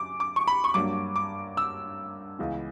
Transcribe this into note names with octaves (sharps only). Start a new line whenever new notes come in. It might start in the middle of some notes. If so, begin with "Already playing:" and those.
Already playing: F#2 D6
D6
C#6
B5
C#6
G2 F#3 A#3 D4 D6
D6
E6
C#2 C#3 E3 B3